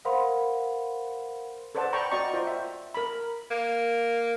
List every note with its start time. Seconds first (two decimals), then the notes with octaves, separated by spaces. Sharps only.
0.05 A#4 C5 F5 F#5 B5 C6
1.75 A4 B4 C5 D5 F#5 A5
1.93 D5 G5 A#5 B5 C#6
2.12 F#4 D5 D#5 A#5 C#6
2.34 F4 C5 D5 G5
2.47 E5
2.94 A#4 B5
3.51 A#3